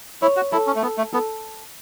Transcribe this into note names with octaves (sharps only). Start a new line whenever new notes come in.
E4 C#5
F#4
E4 A4
C#4
A3
B3 A4
A3
B3 A4